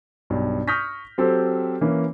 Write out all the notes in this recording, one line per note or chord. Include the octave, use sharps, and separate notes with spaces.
B1 G2
C#6 D#6 F6 G6 A#6 B6
F#3 C4 G4 A4 C5
E3 A#3 C#4